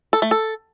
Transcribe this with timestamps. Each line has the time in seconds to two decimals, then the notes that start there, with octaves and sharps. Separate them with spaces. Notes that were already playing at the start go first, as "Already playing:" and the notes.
0.13 A4
0.22 A3
0.31 A4